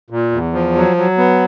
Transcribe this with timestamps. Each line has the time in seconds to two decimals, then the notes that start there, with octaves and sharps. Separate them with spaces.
0.10 A#2
0.32 E2
0.53 F3
0.75 F#3
0.97 F#3
1.18 B3